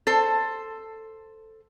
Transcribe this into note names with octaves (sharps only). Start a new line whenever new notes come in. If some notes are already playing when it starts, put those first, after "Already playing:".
A4 C5